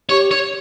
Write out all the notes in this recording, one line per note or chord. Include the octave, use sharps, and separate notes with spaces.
G4 C#5
C#5